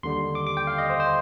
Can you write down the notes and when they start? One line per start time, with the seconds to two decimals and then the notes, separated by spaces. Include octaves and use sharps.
0.03 D#2 D3 G3 C6
0.35 D6
0.47 D6
0.57 G5
0.67 F5
0.78 D#5
0.90 C5
1.00 C5